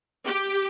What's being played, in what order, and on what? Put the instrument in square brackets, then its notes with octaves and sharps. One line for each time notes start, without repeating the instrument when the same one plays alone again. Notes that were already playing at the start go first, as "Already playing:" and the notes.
[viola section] G4